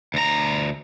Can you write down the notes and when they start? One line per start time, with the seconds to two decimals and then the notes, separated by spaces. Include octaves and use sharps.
0.14 D2 A#5